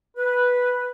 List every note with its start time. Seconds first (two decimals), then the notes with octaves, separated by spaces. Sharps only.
0.17 B4